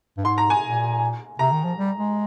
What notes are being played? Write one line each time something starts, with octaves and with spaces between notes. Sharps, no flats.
G2
G#2 C6
A#5
G#5
A#2
C3 A#5
D#3
F3
G3
G#3